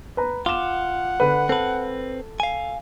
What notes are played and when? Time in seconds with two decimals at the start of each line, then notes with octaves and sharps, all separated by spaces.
0.17 B4 A#5
0.46 F4 F#5 D6 E7
1.20 D3 B4
1.49 C4 A4 B4
2.40 F5 G#5